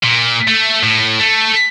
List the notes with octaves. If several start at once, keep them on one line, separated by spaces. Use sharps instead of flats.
A#2
A3
A2
A3